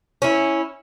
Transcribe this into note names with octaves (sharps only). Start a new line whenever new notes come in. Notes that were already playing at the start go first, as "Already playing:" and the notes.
C#4 E4